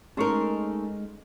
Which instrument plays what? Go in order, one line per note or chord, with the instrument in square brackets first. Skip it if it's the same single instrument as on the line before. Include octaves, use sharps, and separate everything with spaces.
[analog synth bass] G#3 [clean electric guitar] A3 D#4 [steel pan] C#4 C6 C#6 [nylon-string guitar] G#4 A#4